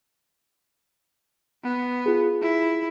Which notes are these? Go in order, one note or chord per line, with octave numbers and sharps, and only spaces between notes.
B3
F4 G#4
E4